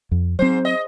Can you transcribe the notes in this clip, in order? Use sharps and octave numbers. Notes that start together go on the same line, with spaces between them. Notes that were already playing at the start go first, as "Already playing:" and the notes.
F2
G#2 F#3 C4 C5
D#5